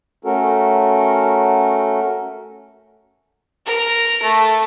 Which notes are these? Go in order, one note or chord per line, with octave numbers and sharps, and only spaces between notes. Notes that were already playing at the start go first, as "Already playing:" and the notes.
A3 C#4 F#4 A4 A#4
A#4
A3